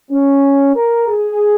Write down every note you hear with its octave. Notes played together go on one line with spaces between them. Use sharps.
C#4
A#4
G#4